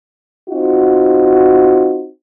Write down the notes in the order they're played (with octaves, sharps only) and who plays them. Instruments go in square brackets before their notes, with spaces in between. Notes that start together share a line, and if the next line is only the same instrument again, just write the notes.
[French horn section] C4 D#4 F4 F#4